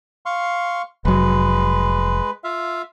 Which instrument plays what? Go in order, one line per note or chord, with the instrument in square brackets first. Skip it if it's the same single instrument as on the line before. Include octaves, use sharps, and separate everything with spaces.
[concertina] F5 C6 C#6
[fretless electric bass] F1 F#3 [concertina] G#3 B4
[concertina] F4 E5 F5